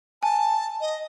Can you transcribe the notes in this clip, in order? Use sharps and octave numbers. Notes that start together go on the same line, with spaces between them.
G#5 A5
D#5